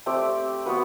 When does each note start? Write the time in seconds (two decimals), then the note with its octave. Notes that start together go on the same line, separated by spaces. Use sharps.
0.06 A3 C4 G4 D5
0.66 B3 F#4 B4